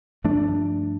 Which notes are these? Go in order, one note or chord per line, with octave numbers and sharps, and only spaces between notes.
G2 F3 A3 D4